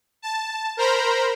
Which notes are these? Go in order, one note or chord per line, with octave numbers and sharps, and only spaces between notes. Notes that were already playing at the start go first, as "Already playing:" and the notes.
A5
A#4 C5 A#5 B5